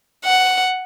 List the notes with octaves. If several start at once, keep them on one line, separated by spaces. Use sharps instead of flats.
F#5